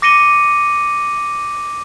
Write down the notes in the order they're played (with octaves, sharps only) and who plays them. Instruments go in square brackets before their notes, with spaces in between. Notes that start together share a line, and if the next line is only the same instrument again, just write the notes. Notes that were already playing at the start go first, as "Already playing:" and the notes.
[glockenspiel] D6 A#6 C#7 D#7 G7